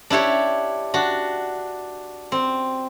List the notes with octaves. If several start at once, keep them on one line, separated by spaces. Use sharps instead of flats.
D4 E4 G4 C#5
D4 F#4
C4